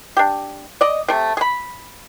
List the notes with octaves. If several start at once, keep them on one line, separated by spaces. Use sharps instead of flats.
D4 G4
D5 D#5
C3 A3
G#4 B5